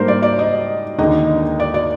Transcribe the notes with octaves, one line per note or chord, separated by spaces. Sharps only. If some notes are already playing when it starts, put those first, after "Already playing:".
Already playing: G#2 G3 A#3 D4 A#4 C5
D5
D5
D#5
D#2 D3 G#3 D#4 D#5
D5
D5